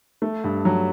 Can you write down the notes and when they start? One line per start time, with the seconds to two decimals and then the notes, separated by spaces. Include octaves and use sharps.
0.22 A3
0.44 G2
0.65 F#3